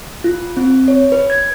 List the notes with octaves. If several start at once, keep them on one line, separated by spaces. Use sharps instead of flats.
F4
C4
C#5
B4
G#6